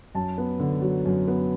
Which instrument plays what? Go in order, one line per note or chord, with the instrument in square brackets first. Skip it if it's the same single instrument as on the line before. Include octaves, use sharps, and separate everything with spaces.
[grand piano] F#2 A5
B3
D3
F#3
F#2
B3